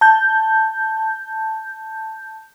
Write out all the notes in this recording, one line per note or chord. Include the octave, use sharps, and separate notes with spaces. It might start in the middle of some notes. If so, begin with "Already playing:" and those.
A5 G6